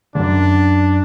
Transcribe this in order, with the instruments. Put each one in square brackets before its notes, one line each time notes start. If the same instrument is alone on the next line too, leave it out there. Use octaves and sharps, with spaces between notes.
[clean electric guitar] C#2 F#2 [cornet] D4